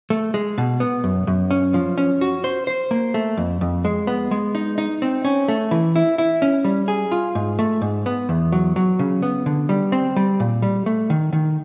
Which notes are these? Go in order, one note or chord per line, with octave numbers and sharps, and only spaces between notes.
A3
G#3
B2
B3
F#2
F#2
C#4
F3
C#4
F#4
C5
C5
A#3
A3
F2
F2
G#3
B3
G#3
D#4
D#4
C4
C#4
A3
E3
E4
E4
C#4
G3
G#4
F4
G#2
A3
G#2
B3
E2
F#3
F#3
C#3
B3
D3
G3
C4
G3
A#2
G3
A3
D#3
D#3